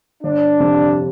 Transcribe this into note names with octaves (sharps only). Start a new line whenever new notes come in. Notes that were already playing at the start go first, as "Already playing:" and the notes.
G1 D4
F2 C3 G3